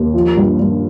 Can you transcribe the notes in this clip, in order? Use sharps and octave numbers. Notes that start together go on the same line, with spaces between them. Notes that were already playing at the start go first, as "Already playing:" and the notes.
Already playing: D#2
F3
G2
G2